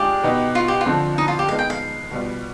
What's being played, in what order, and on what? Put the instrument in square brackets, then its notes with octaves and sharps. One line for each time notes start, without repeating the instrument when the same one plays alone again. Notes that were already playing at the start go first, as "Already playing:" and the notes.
Already playing: [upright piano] G#3 D4 F4 G#4 [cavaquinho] G4
[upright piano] B2 B3 D#4
[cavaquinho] F4
G4
F4
[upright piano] D3 F3 C4
[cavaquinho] D#4
F4
G4
[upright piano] G#3 B3 D#4 [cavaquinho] F5
[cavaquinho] G5
F5
[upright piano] B2 G3 B3 F4